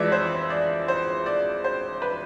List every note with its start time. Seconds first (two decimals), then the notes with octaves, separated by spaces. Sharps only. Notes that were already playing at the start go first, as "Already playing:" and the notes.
Already playing: F2 E3 G#3 D5 E5
0.12 C5
0.50 D5
0.88 C5
1.26 D5
1.64 C5
2.02 B4